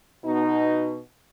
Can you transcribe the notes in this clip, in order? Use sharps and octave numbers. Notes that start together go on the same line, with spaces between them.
B2 D#4